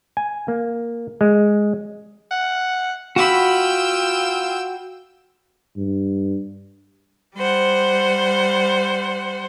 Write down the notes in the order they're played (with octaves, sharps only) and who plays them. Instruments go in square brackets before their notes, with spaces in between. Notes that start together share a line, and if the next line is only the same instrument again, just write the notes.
[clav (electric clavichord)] G#5
A#3
G#3
[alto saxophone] F#5
[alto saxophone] F4 [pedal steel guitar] F#4 B5 [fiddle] G5 E6
[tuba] G2
[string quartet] G3 C5 F#5